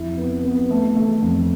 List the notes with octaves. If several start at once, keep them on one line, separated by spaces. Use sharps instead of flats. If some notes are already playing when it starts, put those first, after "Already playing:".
Already playing: F2 E4
B3
B3
A3
A3
F2